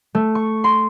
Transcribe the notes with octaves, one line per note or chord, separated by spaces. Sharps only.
A3
C#6
C6